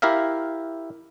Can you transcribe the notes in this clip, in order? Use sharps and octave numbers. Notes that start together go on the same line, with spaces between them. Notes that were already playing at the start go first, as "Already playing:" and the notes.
E4 G4 A#4 E5 F5